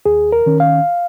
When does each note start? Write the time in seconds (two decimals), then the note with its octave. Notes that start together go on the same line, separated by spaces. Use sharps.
0.06 D#2 G#4
0.32 A#4
0.46 D#3 C#4
0.60 F5